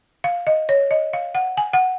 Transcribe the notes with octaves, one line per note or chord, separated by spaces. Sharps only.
F5
D#5
C#5
D#5
F5
F#5
G#5
F#5